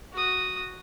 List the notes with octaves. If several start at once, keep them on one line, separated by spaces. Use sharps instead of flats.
F#4 D#6